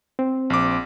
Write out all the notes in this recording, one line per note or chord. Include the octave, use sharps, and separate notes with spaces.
C4
A#1 D6